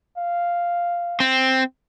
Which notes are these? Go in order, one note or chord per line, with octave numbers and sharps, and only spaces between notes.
F5
C4